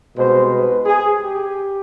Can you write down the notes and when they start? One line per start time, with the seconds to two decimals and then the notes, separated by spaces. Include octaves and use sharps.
0.16 C2 B2 G#3 C5
0.52 B4
0.86 G#4
1.21 G4